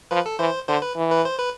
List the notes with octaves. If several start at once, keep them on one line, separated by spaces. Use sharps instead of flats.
F3 B4
A4
E3 C5
D3 C5
B4
E3
B4
C5
B4